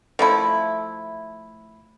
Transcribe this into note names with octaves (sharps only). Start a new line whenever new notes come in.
F3 A3 E4